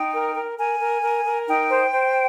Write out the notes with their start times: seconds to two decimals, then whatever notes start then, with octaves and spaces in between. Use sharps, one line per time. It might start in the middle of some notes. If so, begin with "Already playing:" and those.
Already playing: D#4 G5
0.14 A#4
0.36 A#4
0.57 A#4 G#5
0.80 A#4
1.02 A#4
1.25 A#4
1.47 D#4 G5
1.69 C5
1.91 C5